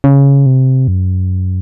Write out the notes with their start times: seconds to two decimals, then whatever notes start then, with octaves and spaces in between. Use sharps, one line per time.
0.04 C#3
0.46 C3
0.88 F#2